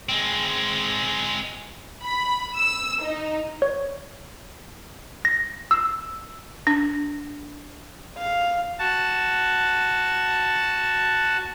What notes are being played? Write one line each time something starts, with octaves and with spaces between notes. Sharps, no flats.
G#3 C4
B5
E6
D#4
C#5
A#6
E6
D4
F5
F#4 A5